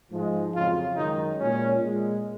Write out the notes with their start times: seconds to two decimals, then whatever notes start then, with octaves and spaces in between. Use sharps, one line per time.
0.10 G#2 F3 G#3
0.53 F2 C#3 F#3 F4
0.96 F#2 D#3 G#3 D#4
1.38 A#2 G#3 C#4
1.81 A#2 G#3